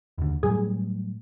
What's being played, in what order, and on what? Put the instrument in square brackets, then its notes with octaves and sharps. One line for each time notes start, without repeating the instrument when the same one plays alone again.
[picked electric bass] D#2 D3
[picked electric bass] A2 F#3 G3 [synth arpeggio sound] G#4